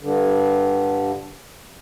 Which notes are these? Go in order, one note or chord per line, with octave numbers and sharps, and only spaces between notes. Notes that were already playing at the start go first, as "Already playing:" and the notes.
G2 D3